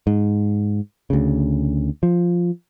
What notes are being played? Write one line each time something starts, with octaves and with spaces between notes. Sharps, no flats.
G#2
D2 C#3
F3